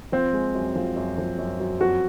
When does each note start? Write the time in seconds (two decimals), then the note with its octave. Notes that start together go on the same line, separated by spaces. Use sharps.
0.12 F3 C4
0.33 G#3
0.55 F#2
0.76 F3
0.96 F#2
1.18 F3
1.38 F#2
1.60 F#2
1.80 F2 F#4